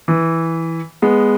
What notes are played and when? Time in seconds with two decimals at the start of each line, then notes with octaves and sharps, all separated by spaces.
0.08 E3
1.02 G#3 B3